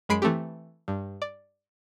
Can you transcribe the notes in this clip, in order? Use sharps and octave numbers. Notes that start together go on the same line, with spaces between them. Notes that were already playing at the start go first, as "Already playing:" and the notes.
F#2 G#3 B5 C7 D7
E3 A3 C4 G4
G2
D5